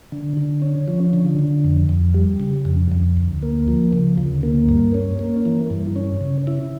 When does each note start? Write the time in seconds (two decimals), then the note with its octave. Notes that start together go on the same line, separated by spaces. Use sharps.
0.12 D3
0.37 D3
0.62 C#4
0.88 F3
1.13 D3
1.39 D3
1.64 F2
1.89 F2
2.14 G3
2.40 C#3
2.65 F2
2.92 F2
3.17 D2
3.42 A#3
3.68 F3
3.93 C#3
4.18 D2
4.43 A#3
4.69 G2
4.94 C#4
5.19 A#3
5.45 E3
5.70 G2
5.96 C#4
6.21 C#3
6.47 E4